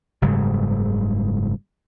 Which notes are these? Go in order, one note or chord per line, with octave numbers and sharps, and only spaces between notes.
F#1 G#2 C#3 G3